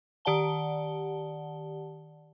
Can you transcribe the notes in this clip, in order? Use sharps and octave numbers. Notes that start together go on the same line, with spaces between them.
D#3 G4 D5 F#5 A5 G7